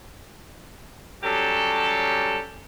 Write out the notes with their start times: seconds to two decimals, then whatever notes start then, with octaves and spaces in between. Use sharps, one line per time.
1.24 F#3 G3 C#4 G4 A4